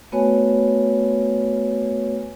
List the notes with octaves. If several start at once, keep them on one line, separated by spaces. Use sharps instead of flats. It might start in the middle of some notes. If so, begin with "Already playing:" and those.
A3 B3 F#4 B4 C#5 G#5